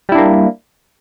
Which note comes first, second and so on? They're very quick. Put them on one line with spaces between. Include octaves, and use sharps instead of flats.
G3 E4 D4 A#3